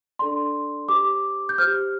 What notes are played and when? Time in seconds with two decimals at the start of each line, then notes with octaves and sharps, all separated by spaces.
0.19 D4 A4 D5 C6
0.89 G4 C5 D6
1.49 G6
1.58 G4 C5 F6